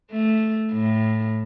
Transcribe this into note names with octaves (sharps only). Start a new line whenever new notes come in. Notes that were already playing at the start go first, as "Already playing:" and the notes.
A3
A2